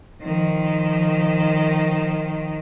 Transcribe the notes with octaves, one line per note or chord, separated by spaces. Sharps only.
D#3 F3